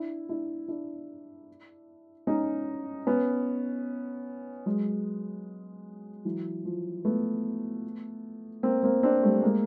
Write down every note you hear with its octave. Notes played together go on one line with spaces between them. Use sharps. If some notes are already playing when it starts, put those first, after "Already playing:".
Already playing: D4 E4
D4 E4
D4 E4
C#4 D#4
B3 C#4
F#3 G#3
E3 F#3
F3
A3 B3
A#3 C4
A#3 C4
C4 D4
G3 A3
G#3 A#3